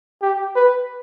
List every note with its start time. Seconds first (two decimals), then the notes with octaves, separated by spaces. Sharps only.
0.22 G4
0.56 B4